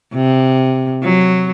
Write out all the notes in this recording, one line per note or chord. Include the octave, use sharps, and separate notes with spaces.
C3
F#3